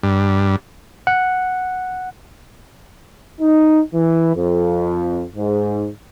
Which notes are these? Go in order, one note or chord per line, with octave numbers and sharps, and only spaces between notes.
G2
F#5
D#4
E3
F2
G#2